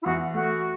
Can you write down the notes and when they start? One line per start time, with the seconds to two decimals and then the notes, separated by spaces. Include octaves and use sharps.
0.01 E4
0.06 E2 F#4
0.34 A3 F#4